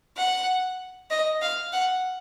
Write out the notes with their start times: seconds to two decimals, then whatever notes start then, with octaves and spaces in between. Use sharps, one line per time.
0.17 F#5
1.10 D#5
1.42 F5
1.73 F#5